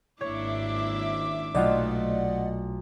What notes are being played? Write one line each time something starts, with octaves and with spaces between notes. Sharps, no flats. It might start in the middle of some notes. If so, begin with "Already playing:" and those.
G#1 A#3 D4 E4 C#5 E5 D6 C#7
B1 A#2 A3 F4 D5 D#5 F#5